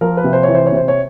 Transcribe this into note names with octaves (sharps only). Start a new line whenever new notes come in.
F3 A#4
B4
C3
C5
C#5
E3
C5
C#5
C3 C5
C#5